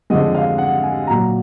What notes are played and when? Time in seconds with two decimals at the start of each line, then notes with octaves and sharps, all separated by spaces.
0.10 F2 D3 F3 G#3 D#5
0.34 F5
0.58 F#5
0.83 G#5
1.07 A#2 F#3 A#5